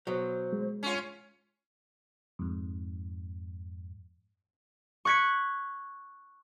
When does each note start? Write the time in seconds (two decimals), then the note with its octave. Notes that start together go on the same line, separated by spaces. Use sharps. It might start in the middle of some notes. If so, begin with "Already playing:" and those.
0.07 B2 F#3 C5
0.53 G#3
0.83 C#4 F4 C#5
2.39 F2 G#2
5.05 C#6 F#6 G#6 B6 C#7